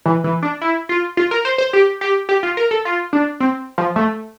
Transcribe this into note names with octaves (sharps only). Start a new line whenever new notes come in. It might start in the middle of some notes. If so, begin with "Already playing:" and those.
E3
E3
D4
E4
F4
F4
A#4
C5
C5
G4
G4
G4
F4
A#4
A4
F4
D4
C4
F3
A3